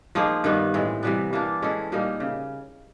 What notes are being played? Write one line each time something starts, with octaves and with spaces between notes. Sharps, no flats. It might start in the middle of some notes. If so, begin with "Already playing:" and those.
F3 A#3 D#4 G#4
G2 D#3 G3 B3
A2 E3 G#3 C4
C3 E3 G3 B3
E3 G3 A#3 D4
G#3 C#4 E4 A4
A#2 G3 A#3 D#4
C#3